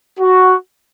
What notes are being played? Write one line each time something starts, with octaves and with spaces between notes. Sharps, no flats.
F#4